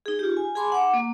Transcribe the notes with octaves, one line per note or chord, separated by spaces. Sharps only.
D#4 G#4
F4 G4
G#5
G#4 G#5 A5 B5 C6 D6
F#5 D6
A#3